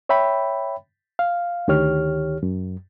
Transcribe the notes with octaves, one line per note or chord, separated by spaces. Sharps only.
C#5 E5 G5 B5
F5
D2 D#3 G4 C#5 F6
F#2